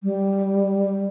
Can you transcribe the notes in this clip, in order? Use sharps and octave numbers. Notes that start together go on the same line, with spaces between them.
G3